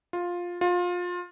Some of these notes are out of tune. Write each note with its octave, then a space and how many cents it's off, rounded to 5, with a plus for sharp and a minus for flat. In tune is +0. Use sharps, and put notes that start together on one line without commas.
F4 +10
F4 +25